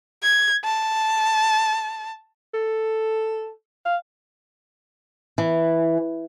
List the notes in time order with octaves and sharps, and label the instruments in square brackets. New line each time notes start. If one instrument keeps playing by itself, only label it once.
[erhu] G#6
A5
[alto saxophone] A4
F5
[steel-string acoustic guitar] E3